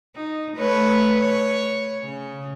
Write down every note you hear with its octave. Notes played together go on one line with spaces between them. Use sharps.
D#4
A3 B4 C#5
C#5
C#3